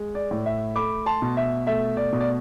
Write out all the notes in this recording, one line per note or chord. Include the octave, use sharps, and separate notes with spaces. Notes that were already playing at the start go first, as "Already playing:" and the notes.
Already playing: G#3
D5
A2
E5
A3 B5 D6
A5 C6
B2
E5
A3 E5
D5
B2
D5